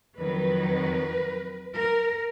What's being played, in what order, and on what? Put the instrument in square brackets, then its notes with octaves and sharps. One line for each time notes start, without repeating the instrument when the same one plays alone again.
[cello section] F2 D#3 F#3 B4
A#4